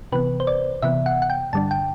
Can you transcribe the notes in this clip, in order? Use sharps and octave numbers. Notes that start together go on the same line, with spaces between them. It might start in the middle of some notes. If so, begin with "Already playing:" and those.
C3 E3 B3 B4
C5
D5
C3 E3 B3 E5
F#5
F#5
G5
G2 D3 G3 D4 A5
G5